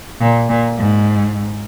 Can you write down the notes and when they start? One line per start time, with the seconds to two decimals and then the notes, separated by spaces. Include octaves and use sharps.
0.21 A#2
0.49 A#2
0.78 G#2